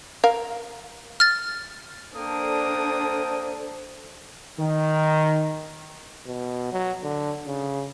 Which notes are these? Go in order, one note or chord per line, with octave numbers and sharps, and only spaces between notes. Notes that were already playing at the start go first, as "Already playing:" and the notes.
A#4 F5
F6 A6
A#3 D4 A4 C5 G5 D#6
D#3
B2
F#3
D3
C#3